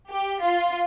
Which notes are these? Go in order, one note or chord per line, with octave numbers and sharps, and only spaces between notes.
G4
F4